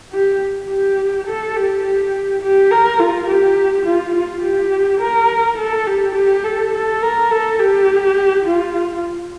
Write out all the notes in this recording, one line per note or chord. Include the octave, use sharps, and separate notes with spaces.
G4
G4
A4
G4
G4
G4
A#4
F4
G4
F4
F4
G4
A#4
A4
G4
G4
A4
A4
A#4
A4
G4
F4